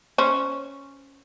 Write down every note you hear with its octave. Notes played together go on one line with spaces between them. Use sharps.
C#4 C5